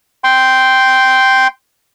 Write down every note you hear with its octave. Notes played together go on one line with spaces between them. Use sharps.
G5 C6